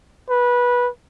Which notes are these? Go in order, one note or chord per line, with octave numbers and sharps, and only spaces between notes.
B4